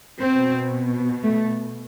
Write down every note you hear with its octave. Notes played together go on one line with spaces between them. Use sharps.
B2 C4
A3